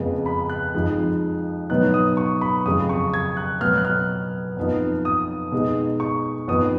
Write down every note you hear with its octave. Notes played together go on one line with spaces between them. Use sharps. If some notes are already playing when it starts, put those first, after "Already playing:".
Already playing: F2 C#3 G#3 B3
B5
F#6
F2 F3 G#3 D#4
B2 F#3 B3 D#4 F#6
D#6
C#6
B5
F2 C#3 F#3 D#6
C#6
G#6
F#6
B2 F#3 B3 F6
F#6
F6
F2 F3 B3 D#4
D#6
B2 G#3 D#4
C#6
F2 F3 B3 D#4 D#6